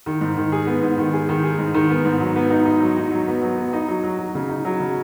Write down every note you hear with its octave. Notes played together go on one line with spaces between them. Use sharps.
D#3
G#2
D#3
G#4
B3
G#2
D#3
G#4
D#3
G#4
G#2
D#3
B3
G#2
F#3
B3
D#4
D#4
F#3
D#4
F#3
B3
F#3
B3
D#4
F#3
F#3
F#3
C#3
D#4
F#3
C#3